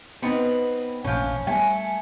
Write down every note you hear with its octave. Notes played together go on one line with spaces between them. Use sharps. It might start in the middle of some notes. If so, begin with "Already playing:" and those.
B3 C4 D#4 B4 F#5
F1 A#1 E3 F3 C#4
G3 A3 G#5